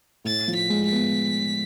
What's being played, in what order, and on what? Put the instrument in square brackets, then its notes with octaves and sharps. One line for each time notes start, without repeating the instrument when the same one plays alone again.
[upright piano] A2 [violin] A6
[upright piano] F3
[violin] B6
[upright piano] G#3
[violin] B6
[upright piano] B3